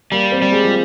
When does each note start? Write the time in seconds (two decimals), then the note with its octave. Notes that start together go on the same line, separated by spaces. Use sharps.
0.12 G3 A#3
0.32 C4
0.42 G3
0.52 G#3
0.63 F3